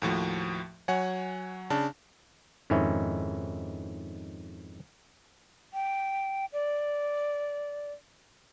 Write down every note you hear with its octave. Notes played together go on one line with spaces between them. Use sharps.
D#2 A2 F3 F#4
F#3 C#5 F#5 G#5
C#3 D4 A5
F2 G#2 D#3 C#4 E4
G5
D5